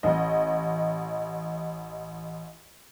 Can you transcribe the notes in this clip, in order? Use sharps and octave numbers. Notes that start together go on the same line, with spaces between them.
A1 D#5